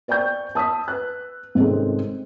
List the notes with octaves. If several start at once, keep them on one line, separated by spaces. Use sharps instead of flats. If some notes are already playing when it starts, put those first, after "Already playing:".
C5 D5 G5 C#6 G6
A5 D#6 E6 B6
B4 F#6
G#1 C3 G#3 C4 C#4 A4